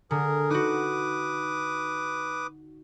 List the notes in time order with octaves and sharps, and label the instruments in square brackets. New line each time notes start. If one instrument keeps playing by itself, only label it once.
[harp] D3 [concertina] G#4 A#4
[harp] D#4 F#4 [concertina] B4 D6 D#6